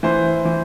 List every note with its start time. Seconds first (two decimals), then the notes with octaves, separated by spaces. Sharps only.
0.03 E3 C5
0.45 E3